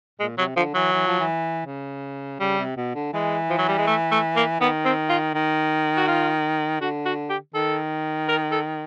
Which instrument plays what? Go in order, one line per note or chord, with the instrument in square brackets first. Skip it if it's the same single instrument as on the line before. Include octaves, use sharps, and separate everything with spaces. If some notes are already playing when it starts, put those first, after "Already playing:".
[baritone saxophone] A#2 [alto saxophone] G#3
[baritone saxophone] C3 [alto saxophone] F#3
[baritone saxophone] D3 [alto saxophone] F3
[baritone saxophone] E3 [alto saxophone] F#3
[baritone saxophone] E3
F3
E3
C#3
[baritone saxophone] C#3 [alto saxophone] G3
[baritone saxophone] C3
B2
D3
[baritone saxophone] E3 [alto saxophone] G#3
[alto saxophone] F3
F#3
G3
G#3
A3
A3
A#3
[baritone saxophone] D#3 [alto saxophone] B3
[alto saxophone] C4
F4
[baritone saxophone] D#3
[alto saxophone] F#4
F4
[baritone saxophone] D3 [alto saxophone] F#4
[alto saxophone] F#4
G4
[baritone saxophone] D#3 [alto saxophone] A4
[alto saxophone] A#4
A4